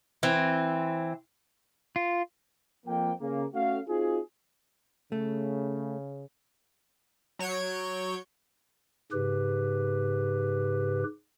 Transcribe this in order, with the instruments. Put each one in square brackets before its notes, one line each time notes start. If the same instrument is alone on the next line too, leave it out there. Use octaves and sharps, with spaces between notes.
[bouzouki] E3 C4
[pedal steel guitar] F4
[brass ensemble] F2 F3 A#3 G5
C#3 A#3
A3 C#4 F#4 F5
C4 D#4 F4 F#4 G#4
[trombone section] C#3 [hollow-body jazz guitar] A3
[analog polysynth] F#3 C#5 G6 G#6 D7
[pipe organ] G#2 C#3 G4 B4